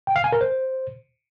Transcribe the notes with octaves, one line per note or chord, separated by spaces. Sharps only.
G5
F5
G#5
A#4
C5